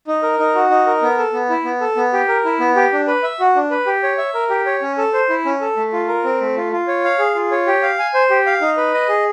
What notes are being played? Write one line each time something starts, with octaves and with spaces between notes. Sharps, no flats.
D#4
A#4
D#4
F#4
D#4
A#4
B3
A4
B3
E4
B3
A4
B3
G4
A#4
E4
B3
G4
D4
B4
E5
F#4
D4
B4
G4
C#5
E5
A#4
G4
C#5
C#4
A4
C5
E4
C#4
A4
A3
F4
A#4
C4
A3
F4
F4
C#5
F5
G#4
F4
C#5
G4
F5
G#5
C5
G4
F5
D#4
B4
D#5
G#4